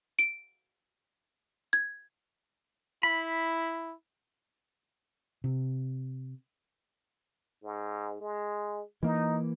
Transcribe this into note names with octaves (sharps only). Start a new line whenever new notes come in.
D7
G#6
E4 B5
C3
G#2
G#3
E3 A#3 D#4